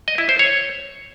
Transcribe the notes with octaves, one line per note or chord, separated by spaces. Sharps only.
D#5
E4
C5
C#5